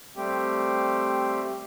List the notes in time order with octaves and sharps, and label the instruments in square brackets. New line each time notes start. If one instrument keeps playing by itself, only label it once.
[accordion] G3 A3 C4 G4